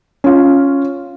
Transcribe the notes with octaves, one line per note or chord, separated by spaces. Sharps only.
C#4 F4